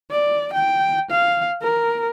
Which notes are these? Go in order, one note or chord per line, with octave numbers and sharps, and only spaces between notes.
D5
G5
F5
A#4